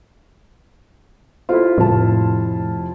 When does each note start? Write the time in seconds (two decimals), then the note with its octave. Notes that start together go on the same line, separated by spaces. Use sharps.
1.49 E4 F4 G4 A4 C5
1.78 F1 A2 A5